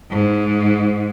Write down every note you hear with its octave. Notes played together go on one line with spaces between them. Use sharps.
G#2